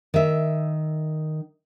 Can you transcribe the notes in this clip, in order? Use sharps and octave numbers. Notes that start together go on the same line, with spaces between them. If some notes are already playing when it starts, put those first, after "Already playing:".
D#3 E5